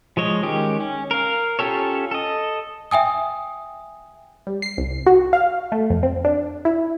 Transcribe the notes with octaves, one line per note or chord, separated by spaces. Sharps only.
F3 G#3 C#5 D#5
D#3 G#3 C#4 G4
C#4
A#4 F5
C#4 F4 G4 A4 C#5
A4 D#5
E5 G5 G#5 D#6
G3
C7
C2
F#4
F5
A3
F2
C4
D4
E4